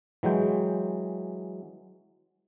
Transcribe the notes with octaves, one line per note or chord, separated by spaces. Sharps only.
E3 F#3 G#3 G5